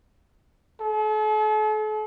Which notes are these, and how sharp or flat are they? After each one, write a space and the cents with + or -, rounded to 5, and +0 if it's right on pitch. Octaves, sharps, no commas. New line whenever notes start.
A4 -45